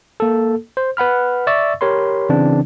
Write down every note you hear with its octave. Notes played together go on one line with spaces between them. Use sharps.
A#3 A4
C5
B4 F#5 B5 F6
D5 E5 C#6 E6 A6
G4 A#4 C#5 B5 C6
C#3 E3 C4 D4